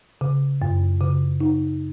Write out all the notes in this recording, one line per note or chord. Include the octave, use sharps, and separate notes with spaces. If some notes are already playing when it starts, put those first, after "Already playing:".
C#3
F#2
C#3
D#4